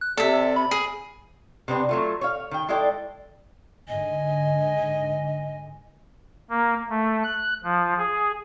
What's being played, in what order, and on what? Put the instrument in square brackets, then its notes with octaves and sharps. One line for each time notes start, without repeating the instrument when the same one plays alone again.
[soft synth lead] F#6
[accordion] C3 [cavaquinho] A4 E5 [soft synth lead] D5
[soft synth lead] B5
[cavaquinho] G#4
[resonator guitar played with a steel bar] C3 B3 C4 D4
F#3 A3 F4
C#5 F5
D#3 G5
G#3 E4 A4 D5 G5
[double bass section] G#2 D3 [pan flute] D#5 [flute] G#5
[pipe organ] A#3
A3
F#6
F3
G#4